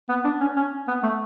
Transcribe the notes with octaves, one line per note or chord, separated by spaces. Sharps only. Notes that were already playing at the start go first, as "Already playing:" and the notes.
B3
D4
C#4
C#4
B3
A3